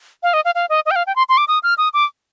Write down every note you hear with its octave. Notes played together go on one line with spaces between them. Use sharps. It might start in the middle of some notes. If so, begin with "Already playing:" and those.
F5
D#5
F5
F5
D#5
D#5
G5
F5
G5
C6
C6
D6
D#6
F6
D#6
D6